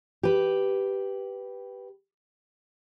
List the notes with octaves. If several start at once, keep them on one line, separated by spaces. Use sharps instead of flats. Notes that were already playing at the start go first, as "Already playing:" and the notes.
G4 B4